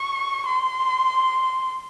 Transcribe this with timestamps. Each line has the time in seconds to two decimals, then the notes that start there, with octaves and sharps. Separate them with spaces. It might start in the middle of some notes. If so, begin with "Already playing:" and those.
Already playing: C#6
0.46 C6